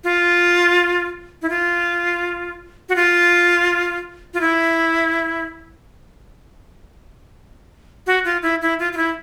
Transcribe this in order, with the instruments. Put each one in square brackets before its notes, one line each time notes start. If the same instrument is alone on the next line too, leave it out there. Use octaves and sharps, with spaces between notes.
[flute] F4
E4
F4
F#4
F4
F4
E4
F#4
F4
E4
E4
F4
F4
E4